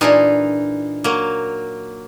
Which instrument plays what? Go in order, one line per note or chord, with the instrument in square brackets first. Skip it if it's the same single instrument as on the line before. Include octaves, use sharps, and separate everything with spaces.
[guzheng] A#2 D4 G#4 [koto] E3 D#4 F4
[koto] F#3 A#3